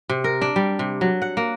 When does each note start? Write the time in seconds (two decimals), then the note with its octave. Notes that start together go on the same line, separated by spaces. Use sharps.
0.09 C3
0.24 A#4
0.42 D4
0.56 G3
0.79 C3
1.01 F#3
1.22 F#5
1.37 A#3